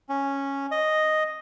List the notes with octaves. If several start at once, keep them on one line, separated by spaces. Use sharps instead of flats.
C#4
D#5